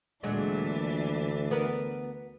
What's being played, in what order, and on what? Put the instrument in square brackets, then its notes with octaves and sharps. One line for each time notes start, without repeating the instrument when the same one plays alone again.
[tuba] D2 [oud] A#2 F#3 G#3 [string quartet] E3 D4
[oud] B3 A#4